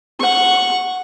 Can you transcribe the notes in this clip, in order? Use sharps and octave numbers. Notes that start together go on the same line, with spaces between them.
F#5 C#6